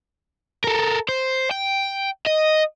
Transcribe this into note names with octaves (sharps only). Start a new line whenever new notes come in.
A4 A#4
C5
G5
D#5